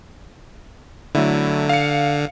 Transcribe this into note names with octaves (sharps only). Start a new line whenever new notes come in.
D3 F#3 A3 E4
F5 C#7